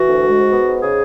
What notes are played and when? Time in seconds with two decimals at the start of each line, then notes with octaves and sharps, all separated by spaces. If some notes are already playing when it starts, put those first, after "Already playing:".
Already playing: E3 F#4
0.08 D2
0.23 G#3
0.38 G#2
0.52 B3
0.67 G#2
0.82 C#3 G#4